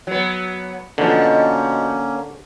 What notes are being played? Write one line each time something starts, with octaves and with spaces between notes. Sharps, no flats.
F#3 B3
B2 D3 F3 A#3 C#4